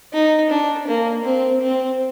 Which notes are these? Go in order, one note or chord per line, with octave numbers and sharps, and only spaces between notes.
D#4
D4
A#3
C4
C4